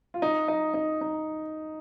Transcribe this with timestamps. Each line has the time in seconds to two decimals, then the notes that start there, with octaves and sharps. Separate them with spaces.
0.14 F4
0.22 D#4
0.48 D#4
0.74 D#4
1.01 D#4